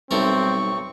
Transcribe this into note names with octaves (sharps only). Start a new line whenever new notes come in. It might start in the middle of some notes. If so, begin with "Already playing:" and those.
B1 G3 A3 B3 C4 D#4 A#4 C#6